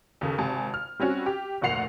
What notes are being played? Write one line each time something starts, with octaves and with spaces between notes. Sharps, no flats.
D#2 C#3 A4
G#1 C3 G#5 A5
F6
G3 C4 C#4 F#4
G4
F1 D2 A#2 F#5 C7 F7